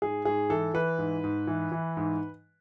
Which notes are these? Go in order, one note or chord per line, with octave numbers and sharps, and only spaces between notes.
G#2 G#4
G#2 G#4
E3 A4
E3 B4
G#2
G#2
E3
E3
G#2